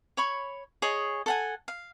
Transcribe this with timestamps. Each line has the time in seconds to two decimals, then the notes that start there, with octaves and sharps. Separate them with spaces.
0.17 C#5 B5 C#6
0.82 G#4 C#5 D#5
1.26 A4 F#5 G#5
1.68 F5